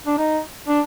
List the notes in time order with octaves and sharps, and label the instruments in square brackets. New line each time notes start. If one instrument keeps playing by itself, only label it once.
[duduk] D4
D#4
D4